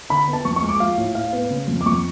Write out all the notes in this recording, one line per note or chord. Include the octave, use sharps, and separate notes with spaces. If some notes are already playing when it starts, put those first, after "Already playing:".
D3 B5
B3
A5
F2 C#6
C#6
G#3
D6
F3 F5
A2
A2 F5
B3
C#3
F2
D6
F2 C#6